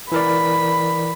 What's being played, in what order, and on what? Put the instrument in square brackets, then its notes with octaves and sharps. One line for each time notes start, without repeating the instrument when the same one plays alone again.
[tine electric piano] E3 A#4 D5 [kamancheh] B5